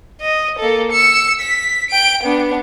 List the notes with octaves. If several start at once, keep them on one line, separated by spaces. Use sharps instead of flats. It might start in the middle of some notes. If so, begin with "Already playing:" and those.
D#5
A#3 A4
E6 C#7
B6
G5 D7
B3 D4